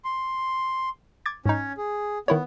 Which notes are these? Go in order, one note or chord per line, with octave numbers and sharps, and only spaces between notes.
C6
D6 G#6 A6
G#2 C#4 D#4 C#5
G#4
D#3 B3 E4 C#5